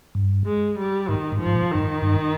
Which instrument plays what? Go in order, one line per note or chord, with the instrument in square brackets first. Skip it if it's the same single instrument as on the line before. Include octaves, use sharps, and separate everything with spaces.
[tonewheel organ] G2
[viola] G#3
G3
[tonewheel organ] G#2 [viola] D#3
[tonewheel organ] G#2
[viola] F3
[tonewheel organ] G#2
A#2
[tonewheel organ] G2 [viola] D#3
[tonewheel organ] G#2
G2